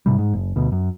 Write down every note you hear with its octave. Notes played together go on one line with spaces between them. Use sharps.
G#2 C3 G3
G#2
F#1
D2 B2
F#2